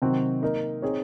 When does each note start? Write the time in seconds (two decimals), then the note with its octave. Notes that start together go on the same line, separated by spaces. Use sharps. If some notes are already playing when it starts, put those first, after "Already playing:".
0.02 C3 D#3 F#3 C4 F#4
0.42 A#3 D#4 A#4
0.82 C4 D#4 G#4 C#5